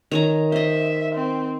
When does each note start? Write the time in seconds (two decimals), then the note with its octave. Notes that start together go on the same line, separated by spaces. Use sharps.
0.11 D#3 C#5 A#5
0.52 C5 D#5 E5
1.15 C4